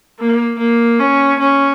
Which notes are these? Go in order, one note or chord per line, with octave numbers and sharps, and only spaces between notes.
A#3
A#3
C#4
C#4